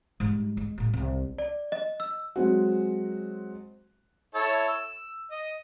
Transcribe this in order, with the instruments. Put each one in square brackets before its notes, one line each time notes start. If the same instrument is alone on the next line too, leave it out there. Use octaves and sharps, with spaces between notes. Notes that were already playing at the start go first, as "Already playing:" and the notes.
[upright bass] G#2 G3
G#3
A2 G3
C2
[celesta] D5
D#5
E6
[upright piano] F#3 G#3 C4 F#4
[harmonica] E4 A4 C#5
E6
D#5